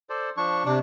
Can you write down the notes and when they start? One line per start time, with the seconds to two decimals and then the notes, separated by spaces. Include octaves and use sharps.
0.10 A4 C5 D5
0.37 F3 D4 C#6
0.65 C3 D4